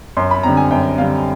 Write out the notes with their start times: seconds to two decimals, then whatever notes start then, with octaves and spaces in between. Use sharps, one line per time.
0.17 F#2 C6
0.31 B5
0.43 D3 G3 C4 A#5
0.57 G#5
0.71 F#2 G5
0.97 D3 G3 C4 F5